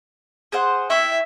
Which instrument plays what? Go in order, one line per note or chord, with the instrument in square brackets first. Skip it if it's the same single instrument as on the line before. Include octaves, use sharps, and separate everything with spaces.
[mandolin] G#4 C5 F#5
[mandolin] E4 G5 C#6 [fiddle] E5